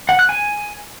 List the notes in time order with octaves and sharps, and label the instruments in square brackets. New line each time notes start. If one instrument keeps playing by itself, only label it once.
[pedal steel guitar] F#5
F#6
G#5